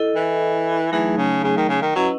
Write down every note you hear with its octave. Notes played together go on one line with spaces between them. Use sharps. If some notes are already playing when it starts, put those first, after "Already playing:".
Already playing: E4 A4 D#5
E3
E3 F#3 A3 D#4 G#4
C#3
C#3
D#3
C#3
D#3
F#3 C#4 E4 B4 D#5 F#5